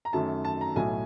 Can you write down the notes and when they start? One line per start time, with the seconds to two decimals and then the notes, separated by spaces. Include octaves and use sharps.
0.05 A#5
0.13 F#2 D#3 F#3 A3 A5
0.45 A5
0.61 A#5
0.76 B1 A2 F#3 G#5